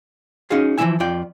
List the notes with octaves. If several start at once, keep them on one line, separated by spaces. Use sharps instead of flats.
C#4 D#4 F#4 G#4 F5
E3 F3 B3 E4 E5 G#5
F2 F4 D5 G5